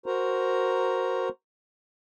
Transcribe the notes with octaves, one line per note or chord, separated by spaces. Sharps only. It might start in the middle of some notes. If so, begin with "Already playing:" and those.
F#4 A#4 C5 A#5